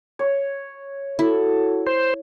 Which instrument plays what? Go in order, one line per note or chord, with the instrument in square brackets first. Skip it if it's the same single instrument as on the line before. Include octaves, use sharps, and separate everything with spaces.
[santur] C#5
[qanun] E4 [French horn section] F#4 A4
[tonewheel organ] C5